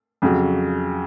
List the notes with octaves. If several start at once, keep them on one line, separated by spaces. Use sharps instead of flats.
F2 C#3 F#3